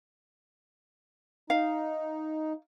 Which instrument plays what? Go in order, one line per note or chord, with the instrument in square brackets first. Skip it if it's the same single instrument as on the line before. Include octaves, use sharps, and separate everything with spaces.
[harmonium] D#4 [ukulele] F5